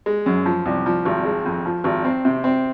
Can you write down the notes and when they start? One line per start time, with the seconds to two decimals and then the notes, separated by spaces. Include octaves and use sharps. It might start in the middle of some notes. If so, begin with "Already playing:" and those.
0.06 G#3
0.26 F#2
0.46 F3
0.66 C2
0.86 F3
1.05 G#1
1.25 G#3
1.46 F2
1.66 F3
1.84 G#1
2.05 C4
2.25 C3
2.44 C4